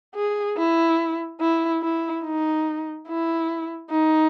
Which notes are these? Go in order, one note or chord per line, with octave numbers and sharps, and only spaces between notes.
G#4
E4
E4
E4
D#4
E4
D#4